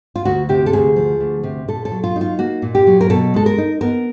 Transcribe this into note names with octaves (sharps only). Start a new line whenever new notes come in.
F4
D2 F#4
C3 G4
A4
D2 G#4
F3
D2
C3
A#2 A4
A4
F#3
F4
D#4
F4
A#3 F#4
A#2
G4
F#3
A#4
B2 A4
G#3 A4
A#4
D#4
B3 A#4